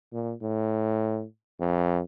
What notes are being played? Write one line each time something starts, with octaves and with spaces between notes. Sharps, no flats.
A#2
A2
F2